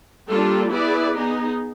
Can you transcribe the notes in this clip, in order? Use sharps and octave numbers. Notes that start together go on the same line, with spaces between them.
G3 A#3 D4 F4 A4
B3 E4 G#4 B4 D5
B3 D#4 G#4